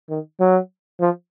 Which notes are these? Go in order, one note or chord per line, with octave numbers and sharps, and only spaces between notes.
D#3
F#3
F3